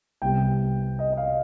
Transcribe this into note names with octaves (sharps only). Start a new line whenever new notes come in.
C2 C3 G3 B3 G5
D#5
D#5
F5